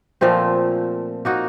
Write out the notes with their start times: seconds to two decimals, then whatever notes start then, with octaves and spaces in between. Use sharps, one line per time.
0.21 A#2 F3 A3 C4
1.25 A#3 D#4 F#4